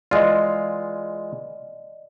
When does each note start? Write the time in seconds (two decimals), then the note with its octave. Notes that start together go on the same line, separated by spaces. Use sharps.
0.11 E3 G#3 F4 D5 D#5